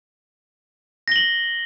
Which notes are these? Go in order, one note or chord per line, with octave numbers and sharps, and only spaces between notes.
A#6 F#7 G7